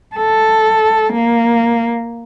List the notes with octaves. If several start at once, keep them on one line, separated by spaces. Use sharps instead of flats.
A4
A#3